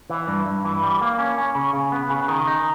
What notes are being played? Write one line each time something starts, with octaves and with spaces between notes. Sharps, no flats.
E3
G2
G2
E3
G3
A#3
C#4
C#4
C#3
C#3
B3
C#3
D#3
D#4